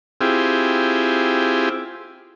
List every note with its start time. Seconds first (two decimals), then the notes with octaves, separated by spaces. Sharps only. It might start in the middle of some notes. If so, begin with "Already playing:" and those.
0.21 C4 E4 F4 G4 G#4